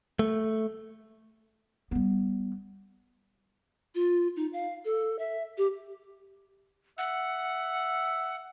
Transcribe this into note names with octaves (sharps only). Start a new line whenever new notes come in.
A3
G3 B3
F4
D#4
F5
A4
E5
G4
E5 F#5